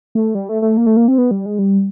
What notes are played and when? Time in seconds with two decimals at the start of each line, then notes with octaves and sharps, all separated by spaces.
0.15 A3
0.35 G3
0.49 A3
0.62 A3
0.77 A#3
0.86 A3
0.97 A#3
1.08 C4
1.18 B3
1.31 G3
1.46 G#3
1.59 G3